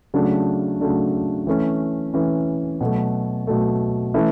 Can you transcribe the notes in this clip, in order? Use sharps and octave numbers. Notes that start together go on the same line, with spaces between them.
C#3 F#3 A3 D4
C#3 F#3 A3 D4
E3 A3 C#4
E3 A3 C#4
B2 F#3 A3
B2 F#3 A3
E3 A3 C#4 E4